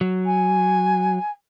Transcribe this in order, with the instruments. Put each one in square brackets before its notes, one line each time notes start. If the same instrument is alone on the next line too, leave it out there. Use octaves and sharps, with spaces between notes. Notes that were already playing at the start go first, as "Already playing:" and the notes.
[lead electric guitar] F#3
[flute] G#5